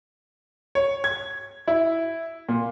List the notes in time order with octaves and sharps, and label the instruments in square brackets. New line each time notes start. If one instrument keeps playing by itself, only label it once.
[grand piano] C#5
G#6
E4
A#2